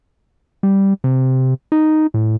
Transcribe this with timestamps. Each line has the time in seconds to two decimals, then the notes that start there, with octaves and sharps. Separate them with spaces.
0.63 G3
1.04 C3
1.72 D#4
2.14 A2